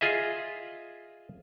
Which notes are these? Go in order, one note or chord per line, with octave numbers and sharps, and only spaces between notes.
F4 G#4 D#5 E5